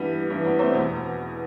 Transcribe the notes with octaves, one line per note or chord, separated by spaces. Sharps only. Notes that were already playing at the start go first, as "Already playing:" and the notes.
Already playing: G2 E3 G3 B3
G2 E3
B3 D4
A3 C4
E2 B2